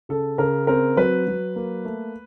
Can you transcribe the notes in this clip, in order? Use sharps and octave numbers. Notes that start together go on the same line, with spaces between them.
C#3 A4
C#3 A#4
C4 A#4
F#3 B4
F#3
A#3
A3